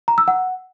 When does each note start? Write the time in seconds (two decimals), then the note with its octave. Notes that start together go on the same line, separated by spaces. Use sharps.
0.08 A#5
0.18 E6
0.28 F#5